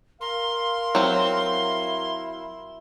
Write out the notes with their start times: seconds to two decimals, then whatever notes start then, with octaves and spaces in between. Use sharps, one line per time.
0.21 A#4 F5 C6
0.95 F#3 C4 E4